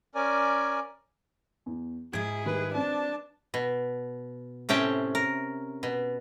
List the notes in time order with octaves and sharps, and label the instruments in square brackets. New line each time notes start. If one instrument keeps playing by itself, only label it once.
[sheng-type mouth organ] C#4 A#4 D5 G#5
[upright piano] E2
[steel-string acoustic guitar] G#2 E4 [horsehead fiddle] G#4 [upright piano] G#6 D7
[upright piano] D#3 G3 [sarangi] B4
[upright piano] C4 [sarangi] D4 [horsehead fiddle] A5
[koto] B2
A2 C3 C#4 G5 A5
A#4
B2